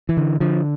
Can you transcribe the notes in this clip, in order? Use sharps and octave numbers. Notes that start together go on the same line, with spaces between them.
E3
D3
D3 F3